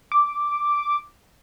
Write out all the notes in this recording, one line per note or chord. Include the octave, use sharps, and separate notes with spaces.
D6